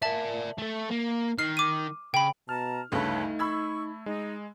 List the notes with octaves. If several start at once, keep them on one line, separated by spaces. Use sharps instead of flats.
A#4 D5 E5 A5
A3 A4
A#3
D#3 F6 C7
D6 D#7
C#3 G5 B5
B2 A5 A#5 F6
G1 D2 C#3 A3 D#4 A4 B4 C#5
B5 C#6 E6 G#6
G#3 D#4